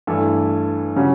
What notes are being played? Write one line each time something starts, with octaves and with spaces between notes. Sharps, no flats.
G2 E3 A3
C#3 F#3 C#4 G4